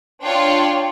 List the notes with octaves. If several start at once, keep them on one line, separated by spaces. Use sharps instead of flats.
D4 F4 C#5 G5 C6